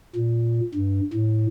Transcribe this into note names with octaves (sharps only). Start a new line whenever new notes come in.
A#2
G2
A2